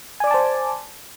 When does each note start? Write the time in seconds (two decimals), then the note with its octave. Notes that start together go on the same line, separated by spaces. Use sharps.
0.20 G#5
0.24 D5
0.27 D6
0.31 A5
0.34 C5